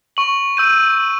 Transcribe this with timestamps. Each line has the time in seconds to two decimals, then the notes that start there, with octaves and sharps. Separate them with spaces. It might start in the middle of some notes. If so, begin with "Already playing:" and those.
0.17 C#6 F#7
0.57 E6 G6 D#7